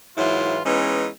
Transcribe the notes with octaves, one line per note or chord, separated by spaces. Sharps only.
G#2 E3 F#3 E4 F4
E3 G#3 B3 C#4 D#4